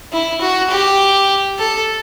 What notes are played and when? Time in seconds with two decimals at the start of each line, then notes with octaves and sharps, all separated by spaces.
0.13 E4
0.41 F#4
0.71 G4
1.59 A4